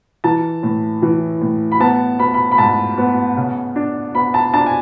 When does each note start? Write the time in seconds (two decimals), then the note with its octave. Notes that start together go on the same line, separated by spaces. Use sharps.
0.24 E3 A5
0.63 A2
1.02 E3
1.42 A2
1.72 B5
1.80 B3 A5
2.19 B3 B5
2.34 B5
2.52 B5
2.58 G#2 A5
2.98 B3
3.37 C#3
3.76 D4
4.15 B3 B5
4.34 A5
4.54 D4 A5
4.66 G#5